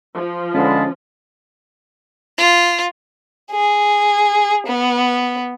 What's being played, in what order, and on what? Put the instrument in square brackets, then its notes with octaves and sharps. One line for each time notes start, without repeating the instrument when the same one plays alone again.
[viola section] F3
[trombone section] D3 G#3 [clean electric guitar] C#4 [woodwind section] F5 A5 B5
[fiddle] F4
[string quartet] G#4
B3